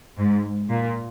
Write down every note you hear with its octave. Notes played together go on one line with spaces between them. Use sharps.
G#2
A#2